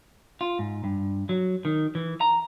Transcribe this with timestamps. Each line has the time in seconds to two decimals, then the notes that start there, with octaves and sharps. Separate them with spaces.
0.41 F4
0.59 G#2
0.84 G2
1.29 F#3
1.65 D#3
1.95 E3
2.21 A#5